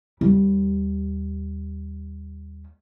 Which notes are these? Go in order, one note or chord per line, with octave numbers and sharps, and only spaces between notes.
D#2 G3